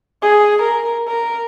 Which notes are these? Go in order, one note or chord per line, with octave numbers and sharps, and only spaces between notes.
G#4
A#4
A#4